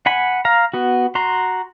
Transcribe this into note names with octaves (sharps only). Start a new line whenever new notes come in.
F#5 G#5 B5
F5 A#5
B3 F#4
F#4 A#5 C6